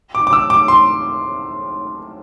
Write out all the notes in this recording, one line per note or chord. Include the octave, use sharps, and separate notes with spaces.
D6
D6
E6
D6
C6